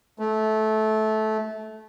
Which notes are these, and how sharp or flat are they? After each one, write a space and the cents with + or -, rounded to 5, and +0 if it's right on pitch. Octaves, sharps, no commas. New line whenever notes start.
A3 -20